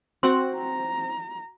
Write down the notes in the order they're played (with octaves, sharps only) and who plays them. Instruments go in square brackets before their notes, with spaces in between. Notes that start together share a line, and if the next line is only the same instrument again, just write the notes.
[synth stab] C4 [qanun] F#4 F#5 [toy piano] C6
[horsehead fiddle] A#5